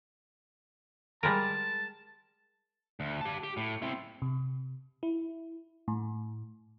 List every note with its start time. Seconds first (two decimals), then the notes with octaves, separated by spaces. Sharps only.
1.23 G3 G#3 A#4 A5
3.00 D2
3.21 G4 A5
3.43 G4
3.57 A2
3.82 C4 E4
4.22 C3
5.03 E4
5.88 A2